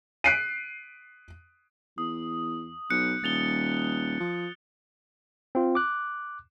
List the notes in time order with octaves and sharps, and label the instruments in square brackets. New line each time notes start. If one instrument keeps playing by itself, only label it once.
[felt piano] F#6 B6 C7 D7 D#7
[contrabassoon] E2 [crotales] D#6
[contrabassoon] B1 [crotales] F#6 G6 C#7
[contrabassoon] D#1 [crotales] A6 F7 G7
[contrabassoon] F3
[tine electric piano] C4 F4
D6 F#6